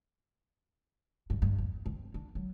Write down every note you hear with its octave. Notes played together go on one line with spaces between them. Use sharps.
G2
G2
E2
C4
D4
F#3